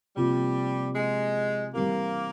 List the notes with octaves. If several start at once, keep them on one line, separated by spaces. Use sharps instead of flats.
C3 F3 G3 A#3 F4
G#3
E3 G3 A#3 C4 G4 A#4